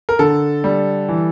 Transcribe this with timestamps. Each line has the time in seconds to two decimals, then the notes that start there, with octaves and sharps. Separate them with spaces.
0.09 A#4
0.19 D3 A4
0.64 G3
1.09 E3